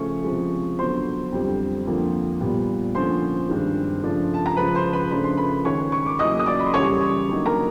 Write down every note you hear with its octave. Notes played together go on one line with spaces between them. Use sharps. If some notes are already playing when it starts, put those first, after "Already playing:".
Already playing: C#3 F3 A3 C#4 C#6
C3 F3 G#3
D3 F#3 B3 C5 C6
F2 D3 G3 C4
F2 D3 F3 A#3
A#2 G3 B3
D3 F3 A#3 C#4 C5 C6
G2 D#3 G#3 C4
C#3 F3 A3 D4
A5
A#5
C#3 F3 G#3 B4 B5
C5 C6
B4 B5
C#3 F3 A3 D4 B5
C6
B4 B5
D#3 G#3 C#4 C#5 C#6
C#6
D6
E2 C#3 F#3 A#3 C#4 D#5 D#6
D#6
D5 D6
B5
C6
F#2 C#3 E3 G3 C#5 C#6
D3 F#3 A#3 D#4
A#4 A#5